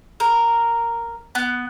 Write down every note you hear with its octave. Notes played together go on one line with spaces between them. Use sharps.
A#4
B3